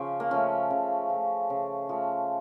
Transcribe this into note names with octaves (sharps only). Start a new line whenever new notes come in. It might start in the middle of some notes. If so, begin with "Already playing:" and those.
Already playing: C#3 F3 C#4
A#3
F3 A3 C#4
C#3
F3 A3
C#3
F3 A3